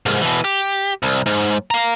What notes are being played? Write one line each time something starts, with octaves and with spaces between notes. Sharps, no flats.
C2 G#2
B2 E3
G4
C2
G#2
F5 A#5